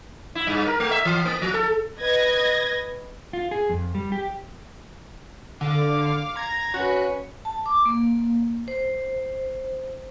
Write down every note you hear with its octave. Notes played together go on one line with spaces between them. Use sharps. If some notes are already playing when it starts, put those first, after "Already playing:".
E4
G2
A#4
A3
E5
E3
A#3
F3
A4
B4 D#5 G#6 A#6
F4
G#4
F2
G3
G4
D3 F5 D6
A#5 G#6
C#4 F#4 B4
A5
D6
A#3
C5